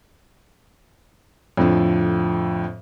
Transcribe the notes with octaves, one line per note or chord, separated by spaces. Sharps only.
F2 A2 D3 F3